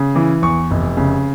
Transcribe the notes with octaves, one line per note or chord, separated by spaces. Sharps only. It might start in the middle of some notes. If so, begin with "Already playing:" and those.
Already playing: C#3
E3
E2 C#6
F1
C#3